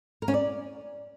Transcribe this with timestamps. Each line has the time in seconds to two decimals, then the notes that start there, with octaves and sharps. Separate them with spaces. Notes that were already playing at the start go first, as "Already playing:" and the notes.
0.22 A#4
0.28 C#4
0.34 D5